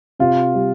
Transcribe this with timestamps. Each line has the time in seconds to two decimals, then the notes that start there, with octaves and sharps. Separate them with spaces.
0.19 C3 F4
0.54 G3